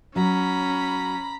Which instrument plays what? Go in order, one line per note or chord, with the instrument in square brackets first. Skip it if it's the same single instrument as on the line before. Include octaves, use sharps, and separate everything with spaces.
[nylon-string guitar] F#3 [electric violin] C#4 [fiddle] A#5 B5